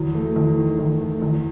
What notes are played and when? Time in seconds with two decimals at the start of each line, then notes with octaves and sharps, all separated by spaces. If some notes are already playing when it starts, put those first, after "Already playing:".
Already playing: E2 F#3
0.15 A3
0.36 E2
0.58 D#3
0.79 E2
1.01 A3
1.22 E2